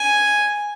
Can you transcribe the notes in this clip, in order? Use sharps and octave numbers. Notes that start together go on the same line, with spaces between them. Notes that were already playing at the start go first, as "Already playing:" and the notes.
Already playing: G#5